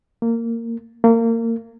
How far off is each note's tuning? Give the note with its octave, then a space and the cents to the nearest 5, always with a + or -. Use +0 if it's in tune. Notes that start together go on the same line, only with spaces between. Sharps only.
A#3 -20
A#3 -30